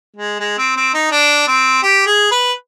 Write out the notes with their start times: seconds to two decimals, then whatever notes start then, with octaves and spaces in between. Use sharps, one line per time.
0.16 G#3
0.40 G#3
0.58 C4
0.77 C4
0.94 D#4
1.11 D4
1.48 C4
1.83 G4
2.06 G#4
2.31 B4